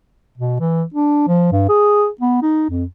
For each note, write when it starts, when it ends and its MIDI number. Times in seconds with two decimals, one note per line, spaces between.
0.38 0.57 47
0.60 0.83 52
0.94 1.24 62
1.28 1.49 53
1.52 1.67 43
1.69 2.08 68
2.21 2.38 59
2.42 2.68 63
2.70 2.84 41